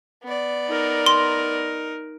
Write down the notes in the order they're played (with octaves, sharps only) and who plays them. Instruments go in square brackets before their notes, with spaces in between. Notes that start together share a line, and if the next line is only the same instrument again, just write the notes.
[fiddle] B3 D5
[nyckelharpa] D#4 A#4
[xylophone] C6